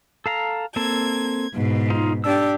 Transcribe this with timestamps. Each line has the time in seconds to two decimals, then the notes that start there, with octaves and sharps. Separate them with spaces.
0.26 A4 F5 A#5
0.76 A#3 C4 A4 G#6
1.54 G#2 B2
1.90 D#4 F4
2.24 D4 G4 E6